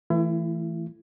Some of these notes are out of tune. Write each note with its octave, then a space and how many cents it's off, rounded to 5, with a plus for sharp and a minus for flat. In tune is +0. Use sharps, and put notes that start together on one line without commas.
E3 +0 A3 +10 E4 +35